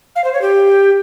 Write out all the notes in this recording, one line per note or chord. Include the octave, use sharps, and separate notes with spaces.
F5
C5
C#5
G4